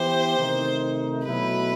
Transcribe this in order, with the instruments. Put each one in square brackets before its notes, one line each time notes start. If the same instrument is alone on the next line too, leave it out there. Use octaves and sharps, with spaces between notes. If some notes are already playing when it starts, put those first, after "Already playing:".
Already playing: [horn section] E3 B3 E4 G4 [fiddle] C5
[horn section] C3 D#3 A3 D#4
[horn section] B2 F#3 A3 E4 [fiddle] B4